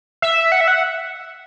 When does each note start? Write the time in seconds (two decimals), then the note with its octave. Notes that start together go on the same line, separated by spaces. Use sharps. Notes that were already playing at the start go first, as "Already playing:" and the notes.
0.22 E5
0.52 F#5
0.61 E5
0.68 F#5